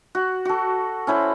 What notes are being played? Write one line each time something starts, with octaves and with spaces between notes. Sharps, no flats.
F#4
F#4 A4
C#4 E4 C5 B5